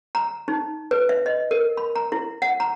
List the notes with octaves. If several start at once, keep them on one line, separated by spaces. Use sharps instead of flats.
A#5
D#4
B4
E5
D#5
A#4
B5
A#5
E4
F#5
A#5